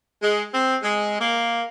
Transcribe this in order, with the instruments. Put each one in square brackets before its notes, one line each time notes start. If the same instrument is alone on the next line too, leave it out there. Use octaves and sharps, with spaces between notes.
[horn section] G#3
C4
G#3
A#3